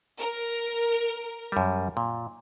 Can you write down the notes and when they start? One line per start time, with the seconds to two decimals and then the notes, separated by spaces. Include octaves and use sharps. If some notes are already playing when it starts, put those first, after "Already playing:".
0.20 A#4
1.52 F#2 G3
1.97 A#2